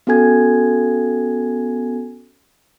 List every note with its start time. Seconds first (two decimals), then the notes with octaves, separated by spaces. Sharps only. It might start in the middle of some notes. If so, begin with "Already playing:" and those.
0.07 B3 C#4 F#4 A4 G#5 G#6